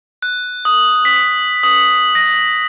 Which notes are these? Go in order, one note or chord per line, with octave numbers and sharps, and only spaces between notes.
F#6
D#6
B6
D#6
A#6